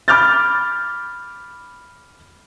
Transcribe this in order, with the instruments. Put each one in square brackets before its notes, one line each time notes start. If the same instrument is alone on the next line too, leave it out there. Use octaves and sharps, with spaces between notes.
[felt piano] B5 D6 F6 G6 A6